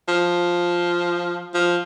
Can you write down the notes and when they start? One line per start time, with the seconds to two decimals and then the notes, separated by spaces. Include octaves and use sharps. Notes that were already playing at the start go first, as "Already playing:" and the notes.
0.08 F3
1.54 F3